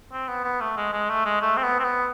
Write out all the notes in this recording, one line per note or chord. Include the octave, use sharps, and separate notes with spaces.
C4
B3
B3
A3
G#3
G#3
A3
G#3
A3
C4
B3
C4
B3